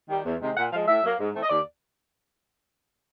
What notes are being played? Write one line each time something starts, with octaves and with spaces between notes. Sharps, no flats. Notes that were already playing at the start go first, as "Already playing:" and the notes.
D#3 G3
E2
C3 D#3 G#3
A#2 F#5
F3 G#3 F5
A2 E5
F#3 A#3
G#2
E3 A3 C4
D#5
D#2 D5